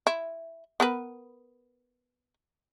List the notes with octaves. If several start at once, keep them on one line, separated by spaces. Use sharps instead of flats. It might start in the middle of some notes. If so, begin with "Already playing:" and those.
E4
B3 A#4 B4